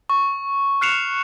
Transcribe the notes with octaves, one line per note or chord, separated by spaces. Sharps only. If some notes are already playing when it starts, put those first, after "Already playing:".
C#6
F6 F#6 C7 C#7 E7 F7